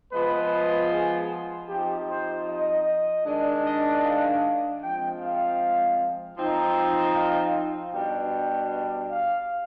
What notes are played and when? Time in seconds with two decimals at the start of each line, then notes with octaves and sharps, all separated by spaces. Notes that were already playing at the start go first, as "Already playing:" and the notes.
0.12 F3 G#3 B3 B4
0.91 G#4
1.68 F3 C4 D#4 G4
2.08 C5
2.47 D#5
3.25 D#3 G#3 D4
3.64 D#5
4.03 F5
4.81 F3 G#3 C4 G5
5.19 F5
6.37 F3 C4 D#4
7.15 F5
7.54 F5
7.92 B2 G3 D4 G5
9.10 F5